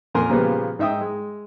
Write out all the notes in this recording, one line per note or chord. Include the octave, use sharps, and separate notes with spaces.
F2 A#2 A#4 G#5 A#5 C6
A#2 C#3 F3 G3 A#3 B3
G#2 D#4 E5 G5 D#6
G#3